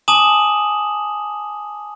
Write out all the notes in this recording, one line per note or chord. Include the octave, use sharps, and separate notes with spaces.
G#5 A5 D6 D#6 E7 F#7